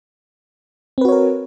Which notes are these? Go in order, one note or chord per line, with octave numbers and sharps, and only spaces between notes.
C4 F#4 A#4 B4 C#5